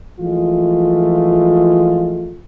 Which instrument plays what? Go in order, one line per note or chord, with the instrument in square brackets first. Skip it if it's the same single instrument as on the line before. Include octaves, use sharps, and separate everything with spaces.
[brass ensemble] E3 F3 G#3 A3 F4